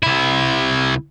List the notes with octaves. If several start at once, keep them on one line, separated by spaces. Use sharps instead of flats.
C2 E4